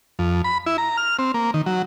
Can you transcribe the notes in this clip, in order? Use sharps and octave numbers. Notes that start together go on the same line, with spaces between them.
F2
B5
E4
A#5
F6
C4
A#3
D#3
F#3